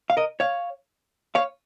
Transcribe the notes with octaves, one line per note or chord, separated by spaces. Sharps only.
F5
A#4 D#5
C#5 F5
C#5 F5